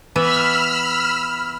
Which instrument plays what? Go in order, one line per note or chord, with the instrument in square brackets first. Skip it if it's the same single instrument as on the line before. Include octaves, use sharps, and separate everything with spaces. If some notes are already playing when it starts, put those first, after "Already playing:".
[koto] E3 B3 E5 [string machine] B5 E6 F6